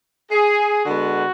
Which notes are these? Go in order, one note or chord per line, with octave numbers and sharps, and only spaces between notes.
G#4
D3 G#3 B3 F#4